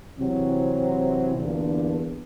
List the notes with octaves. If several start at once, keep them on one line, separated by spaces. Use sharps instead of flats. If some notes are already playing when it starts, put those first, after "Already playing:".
C3 E3 F#3 C4
E2 G2 A#2 D3